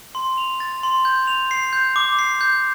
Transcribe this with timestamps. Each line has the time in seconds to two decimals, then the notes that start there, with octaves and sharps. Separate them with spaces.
0.15 C6
0.38 F7
0.60 A6
0.83 C6
1.05 G6
1.27 F7
1.51 C7
1.73 G6
1.96 D6
2.19 C7
2.41 G6